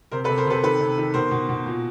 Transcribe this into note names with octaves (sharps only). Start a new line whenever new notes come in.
C3 A#4 C5
A4 B4
C3
A#4 C5
C3 A4 B4
D#3 A4 B4
C3
D#3
B2 A#4 C5
B2
B2
A#2